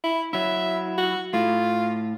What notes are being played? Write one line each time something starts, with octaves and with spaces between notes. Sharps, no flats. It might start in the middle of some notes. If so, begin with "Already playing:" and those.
E4
F#3 E4 E5
F#4
A2 F4